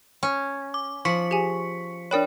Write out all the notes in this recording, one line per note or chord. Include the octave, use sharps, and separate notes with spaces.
C#4
D6
F3 C#6 B6 C#7
G4 G#4 G#5
D4 A#4 C#5 D5 G5 B5